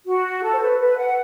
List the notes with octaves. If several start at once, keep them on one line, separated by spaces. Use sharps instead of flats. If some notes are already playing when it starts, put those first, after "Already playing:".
F#4
A4
C5
B4
B4
F#5